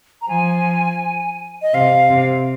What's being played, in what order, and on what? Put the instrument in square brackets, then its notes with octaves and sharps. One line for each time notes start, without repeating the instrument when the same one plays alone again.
[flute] A#5
[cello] F3 [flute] G#5
[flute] D#5
[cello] C3 [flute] F5
[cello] C3